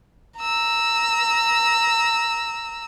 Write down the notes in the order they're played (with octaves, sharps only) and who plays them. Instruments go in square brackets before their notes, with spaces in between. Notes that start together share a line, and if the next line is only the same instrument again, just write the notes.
[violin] A#5 E6